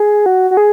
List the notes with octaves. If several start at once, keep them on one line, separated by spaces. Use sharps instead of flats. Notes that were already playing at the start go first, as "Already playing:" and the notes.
Already playing: G#4
F#4
F#4
G#4